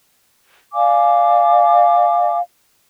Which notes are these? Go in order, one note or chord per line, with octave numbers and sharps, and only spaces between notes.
D5 F5 G#5 D6